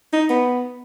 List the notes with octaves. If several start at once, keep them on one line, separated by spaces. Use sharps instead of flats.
D#4
B3